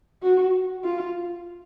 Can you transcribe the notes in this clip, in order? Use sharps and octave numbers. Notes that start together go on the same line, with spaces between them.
F#4
F4